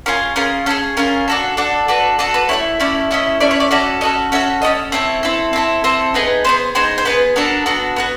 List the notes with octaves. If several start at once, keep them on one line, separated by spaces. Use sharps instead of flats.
C#4 F4 G#4 A#4
C#4 F4 G#4 A#4
C#4 F4 G#4 A4
C#4 F4 G#4 A#4
D4 F#4 A4
D4 F#4 A4
D4 F#4 A4 B4
D4 F#4 A4 D#5
B4
A3 C#4 E4 C#5
A3 C#4 E4 D5
A3 C#4 E4 D#5
A3 C#4 E4 D5
C#5
D5
C#4 F#4 A4 D5
C#4 F#4 A4 D#5
C#4 F#4 A4 E5
C#4 F#4 A4 D#5
C4 E4 A4 C#5
C4 E4 A4
C4 E4 A4
C4 E4 A4 C5
B3 D#4 G#4 B4
B3 D#4 G#4 C5
B3 D#4 G#4 C5
C5
B3 D#4 G#4 B4
B3 D4 F#4 A4 A#4
B3 D4 F#4 A4
B3 D4 F#4